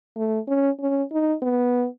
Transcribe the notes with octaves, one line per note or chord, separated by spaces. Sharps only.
A3
C#4
C#4
D#4
B3